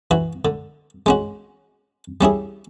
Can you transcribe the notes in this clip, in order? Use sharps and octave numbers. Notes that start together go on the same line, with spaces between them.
E3 F#4
D3
G#3 C#4 F#4
G3 C#4 E4 G#4